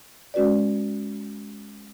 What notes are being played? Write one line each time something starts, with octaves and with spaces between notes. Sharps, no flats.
G#3 C#4 F#4 B4 D5